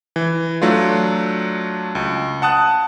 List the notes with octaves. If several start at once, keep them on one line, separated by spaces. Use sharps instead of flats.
E3
F#3 A3 D4 F4
C#2
F#5 A5 D#6 F#6